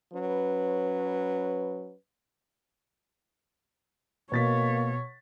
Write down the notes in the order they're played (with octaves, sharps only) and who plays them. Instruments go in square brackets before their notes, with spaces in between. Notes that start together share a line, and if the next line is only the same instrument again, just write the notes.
[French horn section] F#3 C#4 B4
[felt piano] B2 A6 B6 [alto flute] A#3 [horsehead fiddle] C#5